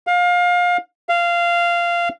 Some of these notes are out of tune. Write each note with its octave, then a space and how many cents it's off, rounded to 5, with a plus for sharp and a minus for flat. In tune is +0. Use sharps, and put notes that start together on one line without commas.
F5 +25
F5 -15